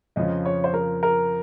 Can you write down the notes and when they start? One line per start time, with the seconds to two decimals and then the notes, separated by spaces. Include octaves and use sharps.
0.16 F2 C#3 F3 D#5
0.45 C#5
0.64 C5
0.74 A#4
1.03 A#4